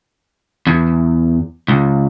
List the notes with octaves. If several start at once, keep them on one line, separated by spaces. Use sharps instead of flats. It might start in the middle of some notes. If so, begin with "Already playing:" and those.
E2
C#2